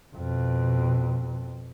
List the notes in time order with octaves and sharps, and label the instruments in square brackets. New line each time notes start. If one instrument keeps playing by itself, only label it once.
[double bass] F2 B2